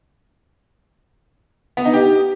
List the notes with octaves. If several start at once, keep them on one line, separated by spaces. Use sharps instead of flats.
B3
D#4
G4